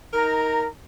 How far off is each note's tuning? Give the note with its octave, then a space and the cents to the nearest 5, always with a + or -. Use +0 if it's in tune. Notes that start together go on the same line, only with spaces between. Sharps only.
D#4 +25 A#4 +0 A#5 -15